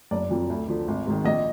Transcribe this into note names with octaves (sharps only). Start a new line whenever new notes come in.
F#1 D5
F2 F3
D2
D3 F3
G#1
G#2 D#3
A#1 D#5